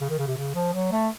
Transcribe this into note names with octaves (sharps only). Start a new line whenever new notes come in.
C#3
D#3
C#3
C3
C#3
F3
F#3
A3